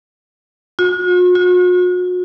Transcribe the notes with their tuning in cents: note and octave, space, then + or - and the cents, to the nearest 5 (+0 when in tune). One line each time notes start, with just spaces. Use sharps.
F#4 -45
F#4 -40